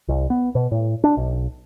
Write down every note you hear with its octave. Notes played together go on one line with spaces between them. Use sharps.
C2
B3
B2
A2
D4
B1